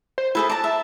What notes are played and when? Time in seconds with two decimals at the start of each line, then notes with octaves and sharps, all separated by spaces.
0.18 C5
0.35 E4 G#4 A4 B4
0.50 D5 A5 A#5
0.64 E5